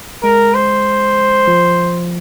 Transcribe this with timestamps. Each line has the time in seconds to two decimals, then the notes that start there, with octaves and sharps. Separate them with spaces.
0.23 G#3 A#4
0.55 C5
1.48 F3